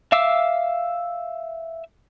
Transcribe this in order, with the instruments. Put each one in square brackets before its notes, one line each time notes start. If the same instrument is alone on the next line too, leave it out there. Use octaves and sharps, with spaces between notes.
[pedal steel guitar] E5 F5 D6 E6